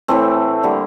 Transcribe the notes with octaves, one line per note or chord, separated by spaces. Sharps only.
A2 E3 A3 C4
D3 G3 A#3